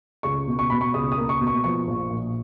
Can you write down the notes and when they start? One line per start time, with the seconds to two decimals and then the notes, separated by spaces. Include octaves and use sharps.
0.23 C#2 C#6
0.47 B2
0.59 C#6
0.70 B2 B5
0.81 C#6
0.94 C#2 D#6
1.12 D#6
1.17 A#3
1.29 C#6
1.41 B2
1.47 C#6
1.64 F3 C#6
1.87 A#1
2.10 A#2